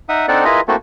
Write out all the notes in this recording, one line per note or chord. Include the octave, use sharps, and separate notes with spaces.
D#4 E5 F#5 D#6
C4 D4 D#4 A4 D5 F#5
E4 F4 G#4 A#4 B4 D#5
A3 A#3 C4 E4 F#4 A4